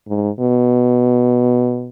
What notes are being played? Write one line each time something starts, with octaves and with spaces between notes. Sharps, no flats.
G#2
B2